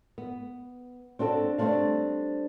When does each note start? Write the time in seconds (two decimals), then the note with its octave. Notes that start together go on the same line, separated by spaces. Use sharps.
0.18 B3
1.19 C4 D4 F#4 A4
1.58 G3 A3 C4 D4 F5